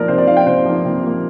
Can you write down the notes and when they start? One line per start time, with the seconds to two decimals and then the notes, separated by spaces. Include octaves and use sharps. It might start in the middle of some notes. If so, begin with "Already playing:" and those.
Already playing: F3 A#3 A#4 D5
0.08 C3 C5
0.18 D5
0.27 F3 A#3 F5
0.37 G5
0.46 C3 C5
0.65 F3 A#3
0.85 C3
1.04 F3 A#3